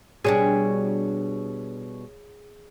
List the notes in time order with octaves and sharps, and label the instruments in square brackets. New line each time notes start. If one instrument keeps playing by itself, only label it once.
[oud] B2 G3 D4 [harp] G#4 C#5